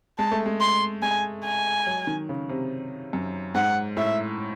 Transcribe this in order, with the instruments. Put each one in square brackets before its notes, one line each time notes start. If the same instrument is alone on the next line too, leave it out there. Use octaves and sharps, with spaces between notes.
[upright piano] G#3 [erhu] A5
[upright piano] A3
G#3
[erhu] C6
[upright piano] G#3 [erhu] G#5
[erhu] G#5
[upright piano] F#3
D#3
C#3
C3
F#2
[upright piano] G#2 [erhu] F#5
[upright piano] A2 [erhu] E5